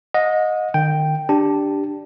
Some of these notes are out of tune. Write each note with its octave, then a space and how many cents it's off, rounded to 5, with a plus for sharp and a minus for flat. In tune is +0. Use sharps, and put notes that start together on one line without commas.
D#5 +0 F#5 -40
D#3 -35 G5 +0
D4 +0 G4 +0 A5 +0